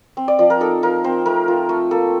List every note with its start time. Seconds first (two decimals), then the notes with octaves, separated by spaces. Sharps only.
0.17 C4
0.28 D5
0.39 F3 D5
0.50 A#4
0.61 D#4 A4
0.83 F3 A#4
1.04 C4 C5
1.26 A3 A#4
1.48 F4
1.69 A3
1.91 A#3 A4